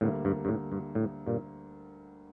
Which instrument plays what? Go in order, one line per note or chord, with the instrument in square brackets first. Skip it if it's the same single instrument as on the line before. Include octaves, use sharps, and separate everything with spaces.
[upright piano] D2 D3 G3 A#3 [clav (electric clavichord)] A2
[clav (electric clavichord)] G2
G2
A2
G2
A2
G2 A#2